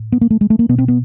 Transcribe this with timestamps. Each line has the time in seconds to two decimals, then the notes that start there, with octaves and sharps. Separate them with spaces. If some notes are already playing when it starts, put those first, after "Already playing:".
Already playing: A2
0.12 B3
0.21 A#3
0.31 A3
0.41 G#3
0.50 A3
0.59 A#3
0.69 B2 B3
0.78 C4
0.88 B3